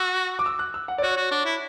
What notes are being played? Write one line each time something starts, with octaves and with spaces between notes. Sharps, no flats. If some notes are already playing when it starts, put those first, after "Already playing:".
Already playing: F#4 E6
D6
E6
F#6
E6
F#5
D5
F#4 C#5
F#4
D4
E4